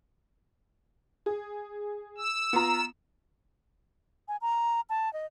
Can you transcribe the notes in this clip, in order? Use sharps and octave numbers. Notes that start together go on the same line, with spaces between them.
G#4
E6
B3 F4 A#5
G#5
A#5
A5
D#5